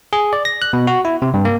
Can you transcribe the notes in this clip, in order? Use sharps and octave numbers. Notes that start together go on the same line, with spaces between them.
G#4
D5
A#6
F#6
B2
F#4
E4
C3
G2
A#3